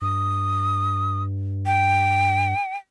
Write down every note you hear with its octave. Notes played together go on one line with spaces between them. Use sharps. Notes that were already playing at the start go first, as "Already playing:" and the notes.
G2 D#6
G5